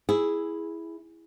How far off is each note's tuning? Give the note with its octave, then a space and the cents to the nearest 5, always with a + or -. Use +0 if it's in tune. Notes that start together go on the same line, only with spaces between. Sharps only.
E4 +0 G#4 +0